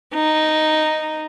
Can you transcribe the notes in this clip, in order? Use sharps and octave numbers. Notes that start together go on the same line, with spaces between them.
D#4